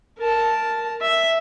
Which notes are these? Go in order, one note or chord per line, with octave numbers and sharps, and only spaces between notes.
A#4 A5
E5